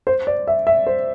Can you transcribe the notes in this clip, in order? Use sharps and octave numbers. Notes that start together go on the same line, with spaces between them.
C5
D5
E5
E5
C5